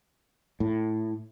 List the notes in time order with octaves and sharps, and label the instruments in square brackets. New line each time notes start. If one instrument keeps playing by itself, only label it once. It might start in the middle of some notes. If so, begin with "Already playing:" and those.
[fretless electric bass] A2